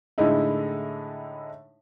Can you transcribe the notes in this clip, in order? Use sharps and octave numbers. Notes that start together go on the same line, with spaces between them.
A2 D3 G#3 D#4 E4